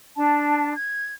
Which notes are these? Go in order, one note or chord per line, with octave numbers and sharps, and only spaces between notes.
D4 A5
G#6